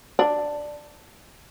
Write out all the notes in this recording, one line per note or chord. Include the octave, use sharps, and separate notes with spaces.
D4